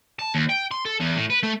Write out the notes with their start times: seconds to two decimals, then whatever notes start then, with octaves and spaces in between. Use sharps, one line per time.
0.19 A5
0.35 D#2
0.49 G5
0.71 C6
0.85 A4
1.00 E2
1.16 A2
1.30 B4
1.43 A3